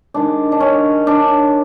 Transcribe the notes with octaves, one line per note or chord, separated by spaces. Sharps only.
D#3 G#3 D4
D4
C#4
D4